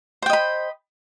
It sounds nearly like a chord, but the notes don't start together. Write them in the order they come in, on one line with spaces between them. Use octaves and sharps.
C5 G5 D#5 B5